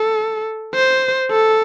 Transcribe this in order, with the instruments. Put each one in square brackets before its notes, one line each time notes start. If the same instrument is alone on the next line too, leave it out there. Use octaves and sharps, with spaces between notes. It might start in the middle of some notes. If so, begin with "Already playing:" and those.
Already playing: [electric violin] A4
C5
A4